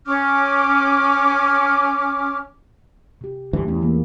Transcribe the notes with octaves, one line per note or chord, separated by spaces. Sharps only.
C#4 D6 F6
C3 G4
D2 G2 E3 A3 G4
E2 C#4 E4
E3 G#3 A#3